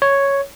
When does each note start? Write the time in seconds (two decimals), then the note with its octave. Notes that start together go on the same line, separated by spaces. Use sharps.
0.02 C#5